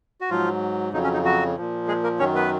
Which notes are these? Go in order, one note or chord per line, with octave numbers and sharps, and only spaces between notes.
F#4
G#2 F3 F#3 F4
F2 C#3 F#3 D#4
C#4
D#4
F#3 F#4
A#2 F3
G#3 G#4
A#3 A#4
F#2 D#3 F#3 C#4 C#5
B3 B4